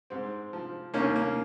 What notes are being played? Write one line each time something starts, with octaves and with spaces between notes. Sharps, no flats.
G#2 C4
F3
D#2 A#3 C#4
A#3